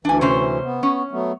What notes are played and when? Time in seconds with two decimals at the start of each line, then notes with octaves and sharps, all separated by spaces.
0.05 D2 E3 D4 G#5
0.21 C3 C#4 C5
0.64 B3
0.83 C#4
1.11 F#3 A3 B3